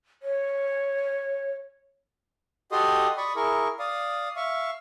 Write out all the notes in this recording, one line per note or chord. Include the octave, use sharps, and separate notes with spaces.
C#5
F#4 G4 A4 D#5 C6 D#6
D5 B5 C#6 D#6
E4 G#4 A#4 C#6
D5 F5 D#6
E5 F5 C#6